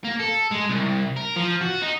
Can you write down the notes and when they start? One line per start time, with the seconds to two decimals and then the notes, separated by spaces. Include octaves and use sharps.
0.05 A#3
0.20 A4
0.52 G#3
0.70 C2
1.16 A#4
1.36 F3
1.61 F#4
1.82 D#4